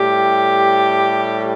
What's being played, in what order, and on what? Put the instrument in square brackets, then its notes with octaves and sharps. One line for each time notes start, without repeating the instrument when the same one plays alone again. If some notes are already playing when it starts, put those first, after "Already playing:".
Already playing: [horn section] A2 G3 G4